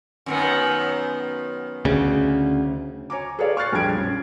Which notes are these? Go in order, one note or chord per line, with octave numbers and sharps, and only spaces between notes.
F#2 D#3 B3
D2 C#3
C#5 G#5 A#5 D6
G#4 A4 B4 C#5 D5 F5
C#6 F6 F#6 A6 C7
A#1 F2 G3 G#4 G#6 D7
A#1 C#4